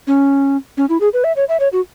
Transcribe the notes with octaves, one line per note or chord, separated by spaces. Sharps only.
C#4
C#4
E4
G#4
B4
E5
C#5
E5
C#5
F#4